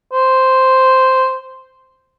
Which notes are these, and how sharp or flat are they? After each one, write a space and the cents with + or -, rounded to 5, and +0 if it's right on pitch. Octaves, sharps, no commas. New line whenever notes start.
C5 -5